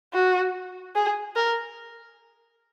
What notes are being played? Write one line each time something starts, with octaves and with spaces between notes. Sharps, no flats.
F#4
G#4
A#4